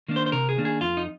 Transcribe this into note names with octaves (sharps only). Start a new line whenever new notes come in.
D#3 A#3 D4
C5
C5
C3 A#4
G#4
D#3 A#3 D4
G#4
F2 F4
D#4